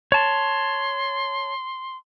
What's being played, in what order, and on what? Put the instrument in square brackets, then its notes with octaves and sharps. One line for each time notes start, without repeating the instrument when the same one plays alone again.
[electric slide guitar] C#5 A5 [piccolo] C6